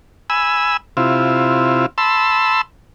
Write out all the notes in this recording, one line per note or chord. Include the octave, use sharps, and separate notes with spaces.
G#5 B5 E6
C3 E4 F4
A5 B5 C6 E6